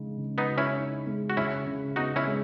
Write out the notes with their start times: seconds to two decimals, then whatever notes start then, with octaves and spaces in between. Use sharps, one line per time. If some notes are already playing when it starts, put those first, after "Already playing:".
Already playing: C#3 G#3 D#4
0.17 C#3
0.38 B3 D#4
0.48 F#4
0.58 C#4 E4
0.78 D#4
1.07 G#3
1.30 F#4
1.37 C#3 C#4 E4
1.67 C#3
1.96 B3 D#4 F#4
2.16 C#4 E4
2.27 G#3